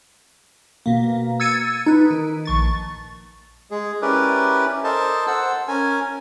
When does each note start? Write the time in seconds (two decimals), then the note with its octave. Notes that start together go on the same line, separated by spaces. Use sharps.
0.86 B2 A#3
1.40 E6 G#6 A6 C#7 D#7
1.86 D#4 B4
2.10 D#3
2.45 A#1 C#6 A6
3.71 G#3 G#4
4.02 C#4 E4 G4 A#4 B4 D5
4.84 A4 A#4 C5 D#5 A5
5.27 C5 F#5 E6
5.68 C#4 A#4 G#5